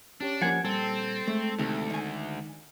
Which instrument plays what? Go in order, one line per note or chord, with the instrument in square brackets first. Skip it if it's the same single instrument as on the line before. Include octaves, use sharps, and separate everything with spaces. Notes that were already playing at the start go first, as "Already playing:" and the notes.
[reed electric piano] C#4 G4 C#5 [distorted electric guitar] D4
[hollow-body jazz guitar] F3 A#3 A#4 [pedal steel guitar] F#5 G#5
[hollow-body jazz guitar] A#2 [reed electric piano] G3 [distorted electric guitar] C4 [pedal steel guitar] A4
[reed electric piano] G#3 [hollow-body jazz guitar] A3
[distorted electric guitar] D2 [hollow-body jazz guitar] C3 D#3 A3
[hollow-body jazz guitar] D#3 G#5